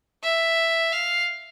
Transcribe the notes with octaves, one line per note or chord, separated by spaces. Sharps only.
E5
F5